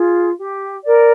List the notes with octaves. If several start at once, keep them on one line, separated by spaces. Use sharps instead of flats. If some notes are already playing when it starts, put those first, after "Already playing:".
Already playing: F4 G#4
G4
A#4 D5